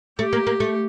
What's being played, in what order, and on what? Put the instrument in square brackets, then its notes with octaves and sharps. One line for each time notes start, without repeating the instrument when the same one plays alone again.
[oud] A3 [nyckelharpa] G4
[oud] A#3
A#3
A3